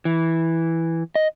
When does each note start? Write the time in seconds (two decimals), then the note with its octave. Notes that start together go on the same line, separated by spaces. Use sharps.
0.05 E3
1.15 D#5